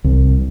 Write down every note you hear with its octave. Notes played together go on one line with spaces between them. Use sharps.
C2